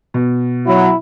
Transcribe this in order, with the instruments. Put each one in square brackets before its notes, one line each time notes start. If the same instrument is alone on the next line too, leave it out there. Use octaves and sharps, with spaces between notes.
[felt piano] B2
[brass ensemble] F#3 [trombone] E4